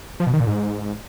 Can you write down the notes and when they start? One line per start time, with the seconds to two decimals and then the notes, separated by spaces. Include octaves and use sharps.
0.20 F3
0.27 B2
0.33 D#3
0.40 A#2
0.47 G#2